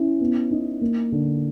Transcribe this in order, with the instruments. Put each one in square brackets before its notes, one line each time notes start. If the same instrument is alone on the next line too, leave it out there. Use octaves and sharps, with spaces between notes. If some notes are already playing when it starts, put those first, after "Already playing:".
Already playing: [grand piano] C#4 E4
B3
D#4
A#3
D3